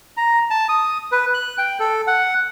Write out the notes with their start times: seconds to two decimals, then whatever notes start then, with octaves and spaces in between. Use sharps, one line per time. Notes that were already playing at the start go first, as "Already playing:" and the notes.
0.17 A#5
0.50 A5
0.69 D#6
1.12 B4
1.34 F#6
1.58 G5
1.80 A4
2.07 F#5